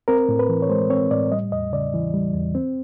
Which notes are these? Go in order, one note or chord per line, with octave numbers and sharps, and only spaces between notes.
C4 A#4
A2
B4
E3
C#5
G#3 C5
C4 C#5
A2 D5
G3 D#5
E2 D#5
C#3 D5
E3
G3
E2
C4